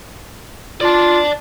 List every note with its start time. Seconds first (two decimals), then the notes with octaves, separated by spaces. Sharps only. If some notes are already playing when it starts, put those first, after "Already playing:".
0.81 F4 D5 A5